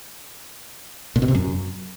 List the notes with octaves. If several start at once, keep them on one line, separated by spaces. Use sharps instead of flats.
A#2
B2
C3
F#2